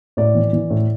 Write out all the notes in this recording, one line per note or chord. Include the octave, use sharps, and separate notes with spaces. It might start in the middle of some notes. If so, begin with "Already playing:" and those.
A2 D5
E3
E3
A2